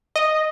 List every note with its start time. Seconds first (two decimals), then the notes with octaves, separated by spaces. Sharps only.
0.16 D#5